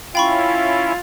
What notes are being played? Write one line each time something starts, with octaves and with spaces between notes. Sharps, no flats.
C#4 E4 F4 G5 B5 C#6